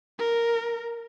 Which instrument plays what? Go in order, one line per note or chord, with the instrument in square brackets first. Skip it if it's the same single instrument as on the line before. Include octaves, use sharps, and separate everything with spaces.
[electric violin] A#4